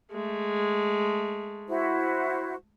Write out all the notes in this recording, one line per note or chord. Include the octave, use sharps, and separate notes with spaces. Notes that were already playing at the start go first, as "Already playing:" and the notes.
G#3 A3
E4 F#4 C5